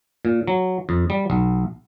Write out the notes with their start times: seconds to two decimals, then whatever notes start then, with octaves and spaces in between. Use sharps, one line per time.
0.25 A#2
0.48 F#3
0.89 F2
1.10 G3
1.30 B1